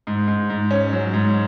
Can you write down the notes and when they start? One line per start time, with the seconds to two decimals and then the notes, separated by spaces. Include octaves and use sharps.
0.07 G#2
0.28 G#2
0.50 G#2
0.71 C#4
0.93 F#3
1.13 G#2